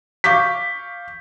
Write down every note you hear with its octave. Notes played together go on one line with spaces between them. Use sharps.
F5 C#6 D6 G6 B6